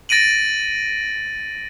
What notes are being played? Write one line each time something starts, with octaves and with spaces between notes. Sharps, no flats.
A6 A#6 D7 D#7 F#7